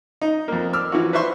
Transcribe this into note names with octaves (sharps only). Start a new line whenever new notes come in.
D#4
F2 A#3
D6 E6 F6
E3 F3 F#4
B4 C5 E5 C6 C#6